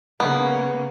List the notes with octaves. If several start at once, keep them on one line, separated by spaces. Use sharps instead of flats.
C#3 A#3 B3